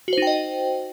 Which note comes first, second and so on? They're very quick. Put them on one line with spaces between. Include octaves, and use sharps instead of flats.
F#4 C5 D#4 G5 D#5